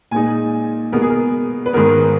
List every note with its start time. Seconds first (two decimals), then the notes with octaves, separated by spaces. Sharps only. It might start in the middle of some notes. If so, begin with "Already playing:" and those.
0.11 A#2 G#3 D#4 G#5
0.92 B2 G#3 B3 A#4
1.02 G#4
1.10 A#4
1.66 B4
1.73 G#2 D#3 G#3 B3 A#4